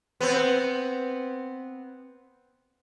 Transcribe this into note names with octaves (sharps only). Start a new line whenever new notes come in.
B3 C4